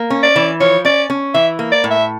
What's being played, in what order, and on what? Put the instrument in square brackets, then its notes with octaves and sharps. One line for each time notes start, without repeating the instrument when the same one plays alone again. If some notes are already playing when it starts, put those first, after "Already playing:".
Already playing: [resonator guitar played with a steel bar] A#3
C#4
[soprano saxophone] D5
[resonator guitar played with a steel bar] E3
[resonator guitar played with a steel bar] F3 [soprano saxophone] C#5
[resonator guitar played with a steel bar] C#4 [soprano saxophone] D5
[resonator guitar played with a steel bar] C#4
[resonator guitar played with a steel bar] E3 [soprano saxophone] E5
[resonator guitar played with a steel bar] A#3
[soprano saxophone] D5
[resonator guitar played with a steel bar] A2
[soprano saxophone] E5